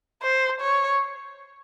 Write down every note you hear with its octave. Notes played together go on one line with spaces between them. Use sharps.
C5
C#5